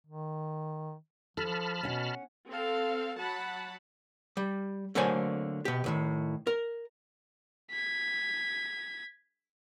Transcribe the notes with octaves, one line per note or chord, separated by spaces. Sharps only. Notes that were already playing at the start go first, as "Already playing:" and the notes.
D#3
F3 A4 A5 B5 F6
B2 C#4 F#5
C4 A4 F5
F#3 F#5 A5 B5
G3
D3 F#3 A3 A#3 C5 G#5
B2 G4
C2 A2 D#3
A#4
G#6 B6